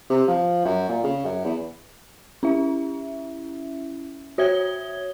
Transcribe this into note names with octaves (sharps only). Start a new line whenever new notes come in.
C3
F3
F#2
A#2
C#3
F#2
E2
C#4 E4 E5
F#4 C#5 E5 D#6 G#6 G7